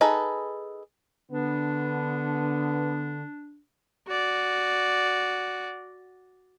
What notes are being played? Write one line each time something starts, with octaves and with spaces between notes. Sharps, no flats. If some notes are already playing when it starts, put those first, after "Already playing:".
D#4 G#4 A4 B4
D3 B3 D4
F#4 D5